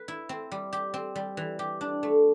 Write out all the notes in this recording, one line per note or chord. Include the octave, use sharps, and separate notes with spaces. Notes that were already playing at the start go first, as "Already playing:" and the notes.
Already playing: B4
E4
C4
G3
G4
C4
G3
E3
G4
D4
A3